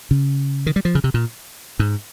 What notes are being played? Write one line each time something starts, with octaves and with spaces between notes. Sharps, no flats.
C#3
D#3
G3
F3
C#3
C3
A#2
G#2